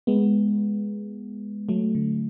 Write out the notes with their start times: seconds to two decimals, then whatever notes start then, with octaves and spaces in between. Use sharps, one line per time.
0.07 G#3 B3
1.69 F#3 A3
1.95 D3